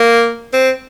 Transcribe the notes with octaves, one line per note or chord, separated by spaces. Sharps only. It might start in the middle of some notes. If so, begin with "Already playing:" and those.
Already playing: A#3
C4